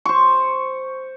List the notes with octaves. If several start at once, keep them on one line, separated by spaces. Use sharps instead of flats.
C5 C#6